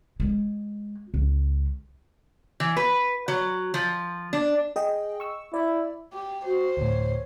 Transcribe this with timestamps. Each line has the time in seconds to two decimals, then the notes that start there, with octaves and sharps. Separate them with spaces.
0.20 G#3
1.14 C#2
2.60 E3
2.77 B4
3.28 F#3
3.74 F3
4.33 D4
4.76 G#4 D#5 G5
5.20 C#6 E6
5.54 E4 D5
6.13 G4
6.44 F#4 C5
6.77 D2 A2 C#5